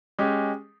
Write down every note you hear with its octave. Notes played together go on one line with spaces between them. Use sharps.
G#3 C#4 G4